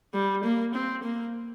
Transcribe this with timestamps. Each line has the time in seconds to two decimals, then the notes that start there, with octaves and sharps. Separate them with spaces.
0.14 G3
0.44 A#3
0.74 C4
1.03 A#3